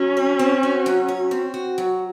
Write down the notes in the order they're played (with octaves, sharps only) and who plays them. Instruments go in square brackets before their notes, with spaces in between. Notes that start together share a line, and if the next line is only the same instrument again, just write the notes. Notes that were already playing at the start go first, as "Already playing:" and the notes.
Already playing: [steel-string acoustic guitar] F#3 [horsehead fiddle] C#4
[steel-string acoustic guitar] C#5
C4
F#4
F#3
C#5
C4
F#4
F#3